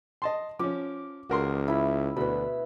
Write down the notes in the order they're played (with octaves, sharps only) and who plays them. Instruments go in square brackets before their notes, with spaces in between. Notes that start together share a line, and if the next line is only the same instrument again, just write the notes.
[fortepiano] D#5 A5 C6
[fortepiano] F3 C#4 [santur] D6
[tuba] C#2 [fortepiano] F#4 A#4 C6
[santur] E4 B5
[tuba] D2 [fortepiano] B2 [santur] B4 B5